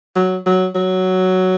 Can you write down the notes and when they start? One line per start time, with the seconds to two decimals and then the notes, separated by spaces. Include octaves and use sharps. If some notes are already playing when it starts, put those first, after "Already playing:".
0.15 F#3
0.46 F#3
0.75 F#3